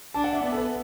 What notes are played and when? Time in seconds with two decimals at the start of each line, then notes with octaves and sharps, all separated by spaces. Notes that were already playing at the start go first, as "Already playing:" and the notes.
0.14 D4 A5
0.24 F#5
0.33 E5
0.42 B3 D5
0.52 A4
0.57 B4